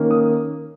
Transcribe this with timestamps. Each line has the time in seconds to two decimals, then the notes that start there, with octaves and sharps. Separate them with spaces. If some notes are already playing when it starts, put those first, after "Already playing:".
Already playing: D#3 A#3 C#4
0.11 D#6